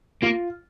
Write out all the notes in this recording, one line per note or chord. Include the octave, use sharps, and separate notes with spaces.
A#3 F4